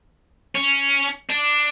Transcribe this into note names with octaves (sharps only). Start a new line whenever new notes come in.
C#4
D4